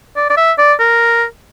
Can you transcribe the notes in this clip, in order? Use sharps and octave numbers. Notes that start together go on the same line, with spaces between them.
D5
D5
E5
D5
A#4